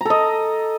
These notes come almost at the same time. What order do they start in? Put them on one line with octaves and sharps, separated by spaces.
A#5 A4 D#5